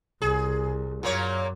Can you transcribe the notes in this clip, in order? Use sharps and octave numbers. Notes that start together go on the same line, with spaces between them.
C2 G#4
F#2 A#2 A#3 C#5